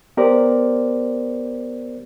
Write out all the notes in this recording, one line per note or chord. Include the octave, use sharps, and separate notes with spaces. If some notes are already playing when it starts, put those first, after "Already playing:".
B3 G4 A#4 C5 D5